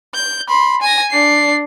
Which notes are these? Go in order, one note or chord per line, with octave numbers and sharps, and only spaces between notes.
G6
B5 C6
G#5 A#6
D4 C7